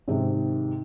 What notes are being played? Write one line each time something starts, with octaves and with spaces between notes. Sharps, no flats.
G#2 C3 D#3